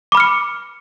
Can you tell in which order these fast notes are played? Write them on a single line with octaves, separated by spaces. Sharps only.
D6 B5 F6 C#7